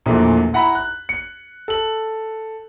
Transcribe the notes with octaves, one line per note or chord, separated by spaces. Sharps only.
A#1 E2 A#2 A3
E4 F#5 A#5 B5
F#6
C#7
A4 F#7